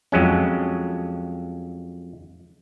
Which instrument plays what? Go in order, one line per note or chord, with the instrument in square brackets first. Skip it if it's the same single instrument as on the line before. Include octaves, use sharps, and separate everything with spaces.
[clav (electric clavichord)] F2 F#3 G#3 C#4